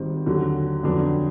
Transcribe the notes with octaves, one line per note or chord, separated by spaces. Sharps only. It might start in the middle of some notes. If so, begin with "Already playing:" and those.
Already playing: G#1 G#2 D#3 G3 C4
D#2 D3 F#3
F2 D3 F#3 B3 D4